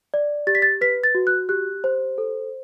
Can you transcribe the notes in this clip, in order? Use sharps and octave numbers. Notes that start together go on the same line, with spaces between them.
D5
G4 A6
B6
A6
B4 B6
A6
F#4
F#6
G4 F#6
C5
A4